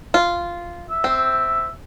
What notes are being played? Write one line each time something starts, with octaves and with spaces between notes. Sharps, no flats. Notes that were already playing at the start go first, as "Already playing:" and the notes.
F4
E5
C4